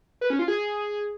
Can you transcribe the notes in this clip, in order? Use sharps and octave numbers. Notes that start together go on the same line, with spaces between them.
B4
C#4
F4
G#4